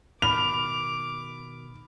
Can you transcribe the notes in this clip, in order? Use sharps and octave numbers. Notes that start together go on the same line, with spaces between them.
B2 D#3 B5 D6 F6 F7